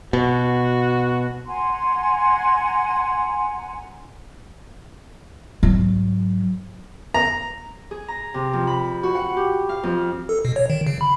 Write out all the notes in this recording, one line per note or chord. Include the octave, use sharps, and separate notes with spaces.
B2 F#4
F#5 G#5 A#5 C6
G#2 F#3
A#5
G#4
A#5
C3
F2
B5
F#4
F#5
G4
F5
F2
A4
B2
C#5
D#3
C#3
B5